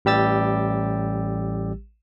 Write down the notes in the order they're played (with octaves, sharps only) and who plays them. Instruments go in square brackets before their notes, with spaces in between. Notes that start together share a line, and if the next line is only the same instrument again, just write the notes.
[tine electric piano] A1 G3 G4 E6 A6